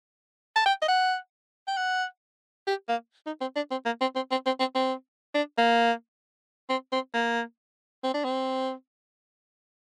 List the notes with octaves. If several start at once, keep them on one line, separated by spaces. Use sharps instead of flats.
A5
G5
D#5
F#5
G5
F#5
G4
A#3
D#4
C4
D4
C4
A#3
C4
C4
C4
C4
C4
C4
D4
A#3
C4
C4
A#3
C4
D4
C4